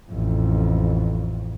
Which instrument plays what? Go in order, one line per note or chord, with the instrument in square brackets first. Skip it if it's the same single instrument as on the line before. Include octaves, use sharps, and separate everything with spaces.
[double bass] A1 F2